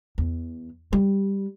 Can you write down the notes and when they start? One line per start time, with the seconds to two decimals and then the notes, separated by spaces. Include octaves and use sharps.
0.18 E2
0.93 G3